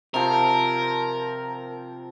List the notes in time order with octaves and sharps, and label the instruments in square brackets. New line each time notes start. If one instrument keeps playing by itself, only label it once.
[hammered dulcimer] C3 F3 [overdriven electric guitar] A#4